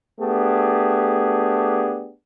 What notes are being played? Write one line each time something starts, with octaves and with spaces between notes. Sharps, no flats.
A3 B3 D4 G4 G#4